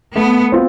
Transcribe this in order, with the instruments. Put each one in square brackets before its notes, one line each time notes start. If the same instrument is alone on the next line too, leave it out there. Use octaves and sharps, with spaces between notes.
[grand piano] A3 [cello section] B3
[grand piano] C4 F4